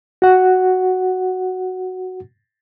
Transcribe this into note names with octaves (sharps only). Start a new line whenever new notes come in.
F#4 F#5